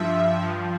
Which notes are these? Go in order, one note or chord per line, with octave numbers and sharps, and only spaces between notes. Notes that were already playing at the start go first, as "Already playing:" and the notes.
Already playing: G2 F3 E5
G2 F3